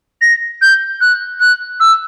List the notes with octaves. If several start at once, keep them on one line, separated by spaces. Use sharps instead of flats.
A#6
G6
F#6
F#6
E6